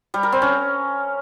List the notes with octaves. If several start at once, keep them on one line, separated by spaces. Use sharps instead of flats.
G3
A#4
C4
C#4